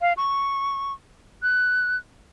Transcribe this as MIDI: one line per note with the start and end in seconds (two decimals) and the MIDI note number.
0.01 0.13 77
0.17 0.93 85
1.43 1.97 90